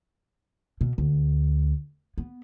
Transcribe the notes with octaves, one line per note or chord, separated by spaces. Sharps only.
B2
D2
B3